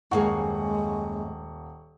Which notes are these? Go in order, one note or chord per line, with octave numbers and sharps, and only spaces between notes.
D#1 F#2 G#3 A#3 G#4 F#5 C#6